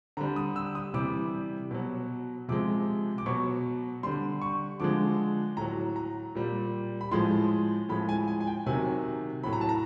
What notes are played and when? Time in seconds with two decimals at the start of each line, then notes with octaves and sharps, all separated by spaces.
0.17 D3 G3 A#5
0.36 D#6
0.56 E6
0.75 D#6
0.94 C3 E3 G3 D6
1.71 B2 F#3
2.48 C3 F3 G#3 D6
3.18 D6
3.26 B2 F#3 C#6
4.03 D3 G3 C6
4.42 C#6
4.80 D3 F3 G#3 D6
5.57 A2 F#3 A#5
5.96 A#5
6.35 A#2 G3
7.01 B5
7.11 A2 F3 G#3 C6
7.89 A2 F3 G#3 B5
8.09 G#5
8.28 G#5
8.40 G#5
8.47 G5
8.66 C3 D#3 F#3 G#5
9.43 A2 F#3 B5
9.53 A#5
9.61 A5
9.69 A#5